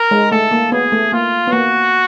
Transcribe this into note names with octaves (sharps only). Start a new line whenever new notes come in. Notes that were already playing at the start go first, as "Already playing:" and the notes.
Already playing: A#4
G#3
A3 A4
A#3
B3 G#4
A3
A#3 F4
B3
A#3 F#4